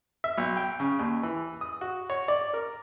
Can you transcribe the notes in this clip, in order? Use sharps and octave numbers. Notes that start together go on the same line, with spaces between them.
E5
B1
G5
C#3
D#2
E3
D#6
F#4
C#5
D5
A#4